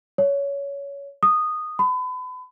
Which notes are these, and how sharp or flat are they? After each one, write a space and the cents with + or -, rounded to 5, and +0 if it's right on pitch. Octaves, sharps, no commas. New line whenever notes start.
C#5 +20
D#6 -10
B5 +35